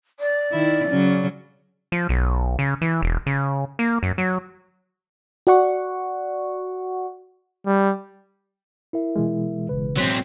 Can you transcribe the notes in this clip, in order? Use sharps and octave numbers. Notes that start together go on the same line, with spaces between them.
D5
D#3 E4
C#3 F#3 C#4
F3
B1
C#3
E3
E1
C#3
A#3
F#2
F#3
F#4 D5 F#5 C#6
G3
E4 A#4 E5
B2 E3 G#3
G1 C#3 B4
F#3 C4 C6 B6